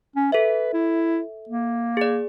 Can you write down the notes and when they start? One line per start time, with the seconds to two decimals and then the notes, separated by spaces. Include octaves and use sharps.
0.16 C#4
0.32 A4 B4 E5
0.74 E4
1.49 A#3
1.97 G#4 D5